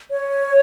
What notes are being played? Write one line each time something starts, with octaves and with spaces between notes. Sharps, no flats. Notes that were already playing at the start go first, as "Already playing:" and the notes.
C#5